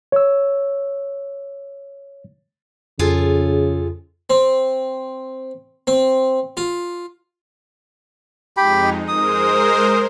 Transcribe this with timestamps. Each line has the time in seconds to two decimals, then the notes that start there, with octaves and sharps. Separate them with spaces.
0.12 C#5 E6
2.99 F2 C#3 F4 G#4 A4
4.30 C4
5.87 C4
6.57 F4
8.57 F2 G#3 D#4 G4 G5 B5
9.08 G#3 A#4 C5 D#6